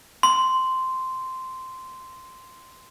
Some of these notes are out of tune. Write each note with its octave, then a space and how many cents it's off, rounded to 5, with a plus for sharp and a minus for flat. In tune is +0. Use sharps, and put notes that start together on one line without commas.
C6 -10